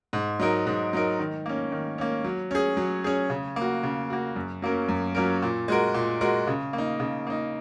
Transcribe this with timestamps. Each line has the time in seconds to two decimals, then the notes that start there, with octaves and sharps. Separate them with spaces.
0.13 G#2
0.40 F#3 D#4 A#4
0.67 G#2
0.93 F#3 D#4 A#4
1.19 D#3
1.46 A#3 C#4
1.72 D#3
1.98 A#3 C#4
2.24 F#3
2.51 C#4 G#4
2.77 F#3
3.04 C#4 G#4
3.30 C#3
3.56 A#3 F#4
3.83 C#3
4.10 A#3 F#4
4.36 F#2
4.62 F#3 A#3 C#4 A#4
4.88 F#2
5.15 F#3 A#3 C#4 A#4
5.42 A#2
5.68 G#3 F#4 A#4
5.94 A#2
6.21 G#3 F#4 A#4
6.47 C#3
6.73 A#3
6.78 D#4
7.00 C#3
7.27 A#3 D#4